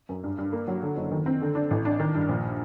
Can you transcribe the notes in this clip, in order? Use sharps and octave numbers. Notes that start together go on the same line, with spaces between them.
F#2
G2
G2
A#3
F#3
D3
F#1
D#3
C4
D3
D4
A1
D4
D#3
G2
A#1